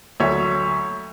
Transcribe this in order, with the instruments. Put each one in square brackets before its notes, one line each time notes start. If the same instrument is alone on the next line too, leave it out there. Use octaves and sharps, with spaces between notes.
[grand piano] D2 F#3 C#5 E5